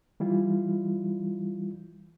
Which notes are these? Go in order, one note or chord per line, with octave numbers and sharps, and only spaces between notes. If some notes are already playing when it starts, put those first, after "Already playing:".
E3 G3 E4 F4